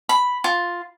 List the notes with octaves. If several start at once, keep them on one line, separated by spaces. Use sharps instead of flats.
B5
F4